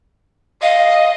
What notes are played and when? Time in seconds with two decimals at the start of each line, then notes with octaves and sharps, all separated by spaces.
0.62 D#5 F5